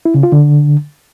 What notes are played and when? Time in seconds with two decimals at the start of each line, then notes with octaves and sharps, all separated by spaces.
0.05 E4
0.14 C#3
0.23 F4
0.32 D3